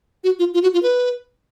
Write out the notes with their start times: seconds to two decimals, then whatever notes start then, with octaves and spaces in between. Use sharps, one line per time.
0.24 F#4
0.39 F4
0.54 F4
0.63 F#4
0.74 F4
0.83 B4